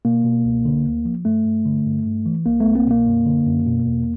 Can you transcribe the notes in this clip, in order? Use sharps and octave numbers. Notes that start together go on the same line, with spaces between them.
B2 A#3
B2
C#2
D3
D2
F3
G2 A3
G2
D3
G2
G2
E3
C2 A#3
A3 B3
C2
A#3 C4
B2 A#3
F#2
D3
F#2
B2
E2